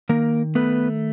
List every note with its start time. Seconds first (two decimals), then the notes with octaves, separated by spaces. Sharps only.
0.09 D#3 A#3 A#4
0.55 A3 B3 B4